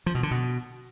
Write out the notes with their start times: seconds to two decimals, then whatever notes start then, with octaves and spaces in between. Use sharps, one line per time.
0.06 F3
0.15 B2
0.23 D3
0.31 B2